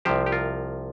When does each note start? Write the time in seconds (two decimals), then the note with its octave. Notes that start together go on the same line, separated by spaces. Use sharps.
0.05 C2 C3 F3 G4 C5
0.26 G4
0.32 F4 A#4